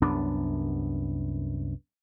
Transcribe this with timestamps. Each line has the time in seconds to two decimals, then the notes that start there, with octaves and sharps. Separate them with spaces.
0.02 C2 F#2 B3 D4